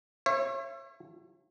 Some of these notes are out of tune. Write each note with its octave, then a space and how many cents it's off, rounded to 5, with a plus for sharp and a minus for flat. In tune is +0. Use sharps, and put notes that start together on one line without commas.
C#5 -35 E5 +35